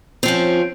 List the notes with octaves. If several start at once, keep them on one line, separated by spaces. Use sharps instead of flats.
F3 C4 C#4